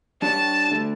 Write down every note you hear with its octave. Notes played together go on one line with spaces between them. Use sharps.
G3 D4 G4 C#5 A5
D3 A3